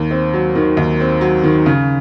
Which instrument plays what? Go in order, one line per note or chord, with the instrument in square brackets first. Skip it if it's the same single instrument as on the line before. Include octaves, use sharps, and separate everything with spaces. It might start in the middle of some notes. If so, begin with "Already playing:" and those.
Already playing: [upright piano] D#2
C4
F#3
D#3
D#2
C4
F#3
D#3
C#3